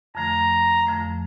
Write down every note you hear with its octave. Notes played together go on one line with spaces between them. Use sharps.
F2 D3 F3 A3 A#5
F2 D3 F3 A3